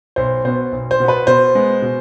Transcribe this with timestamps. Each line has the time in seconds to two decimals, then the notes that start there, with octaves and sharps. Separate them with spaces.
0.16 B1 C5
0.45 B2 B3 C5
0.72 B1
0.91 C5
1.00 B2 B3
1.08 B4
1.27 B2 C5
1.55 G#3 B3
1.82 B2